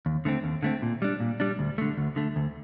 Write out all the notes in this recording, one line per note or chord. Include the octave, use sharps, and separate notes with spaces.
D#2
D3 A3 C4
D#2
D3 A3 C4
A#2
G3 D4
A#2
G3 D4
D2
D3 A3
D2
D3 A3
D2